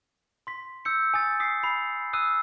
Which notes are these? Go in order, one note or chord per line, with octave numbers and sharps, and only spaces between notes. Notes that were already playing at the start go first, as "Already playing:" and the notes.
C6 B6
E6 G6 C#7
G#5 D#6 A6
D#6 B6 C7
B5 C7
D#6 E6 F#6 D#7